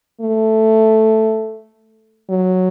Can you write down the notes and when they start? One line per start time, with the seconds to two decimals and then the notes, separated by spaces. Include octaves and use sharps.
0.21 A3
2.29 F#3